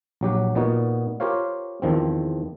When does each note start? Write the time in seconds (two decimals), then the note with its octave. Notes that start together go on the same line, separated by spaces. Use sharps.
0.21 A#1 F#3 G4 F#5
0.55 A#2 B3 D#4 F#4
1.20 F4 G4 A#4 C5 C#5 F5
1.82 E2 D#3 F3 C4